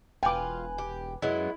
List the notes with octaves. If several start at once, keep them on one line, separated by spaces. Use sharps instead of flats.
E1 F4 B4 G5 G#5 D6
G4
F#2 F#3 G#3 B3 E4